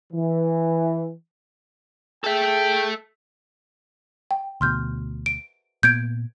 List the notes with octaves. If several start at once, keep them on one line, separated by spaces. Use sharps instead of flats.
E3
G#4 A4 E5 G5
G5
D2 B2 C6 F6 G6
D7
A#2 A#3 B3 G6 G#6 D7